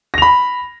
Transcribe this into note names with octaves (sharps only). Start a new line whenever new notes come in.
B5 A#6 F7